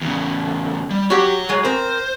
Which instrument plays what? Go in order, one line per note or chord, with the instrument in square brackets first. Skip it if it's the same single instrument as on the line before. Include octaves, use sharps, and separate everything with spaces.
[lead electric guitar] E2 C#3
G3
[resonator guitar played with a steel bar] F#4 G4 [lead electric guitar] C#5 F#5
[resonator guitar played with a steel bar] F#3 G#3
[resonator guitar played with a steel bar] C4 A#4 [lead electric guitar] C5